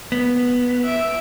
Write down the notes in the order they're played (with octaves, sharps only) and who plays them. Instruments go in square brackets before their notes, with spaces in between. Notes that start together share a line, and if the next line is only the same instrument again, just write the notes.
[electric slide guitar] B3
[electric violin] E5 D7